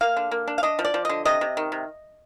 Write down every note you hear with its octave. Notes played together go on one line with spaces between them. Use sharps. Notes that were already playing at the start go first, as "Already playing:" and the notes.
A#3 F5
D3
A#3
D4
F5
D4 D#5
F3
D5
F3
D3 D#5
C3 D#5
C3
D#3
C3